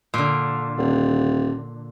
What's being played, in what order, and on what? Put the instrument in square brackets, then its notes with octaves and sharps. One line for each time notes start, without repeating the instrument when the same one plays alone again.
[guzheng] A#2 D3
[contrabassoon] D#1